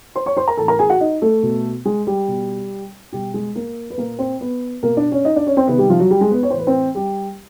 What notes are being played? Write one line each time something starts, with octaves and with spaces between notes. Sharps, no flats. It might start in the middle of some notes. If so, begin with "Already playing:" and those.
C5 C6
C#5 C#6
C5 C6
A#4 A#5
A2 E3 A4 A5
A#4 A#5
G#4 G#5
F#4 F#5
D#4 D#5
A3 A4
B2
G#3 G#4
G3 G4
B2
B2 G3 G4
G#3 G#4
A#3 A#4
B4
A#2 A#3 A#4
C4 C5
B3 B4
B2 A#3 A#4
D4 D5
C#4 C#5
D#4 D#5
D4 D5
C#4 C#5
C4 C5
C3 D#3 B3 B4
G3 G4
F3 F4
F#3 F#4
G3 G4
G#3 G#4
B3 B4
C#5
A2 E3 C5
B4
C4 C5
G3 G4